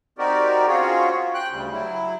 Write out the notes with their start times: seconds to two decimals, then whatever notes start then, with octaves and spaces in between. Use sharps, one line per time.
0.18 C4 D#4 F#4 G4 A#4 D5
0.68 C4 C#4 F4 F#4 G#4 C#5
1.34 G5 F#6
1.51 D2 C#3 G3
1.72 F#3 E4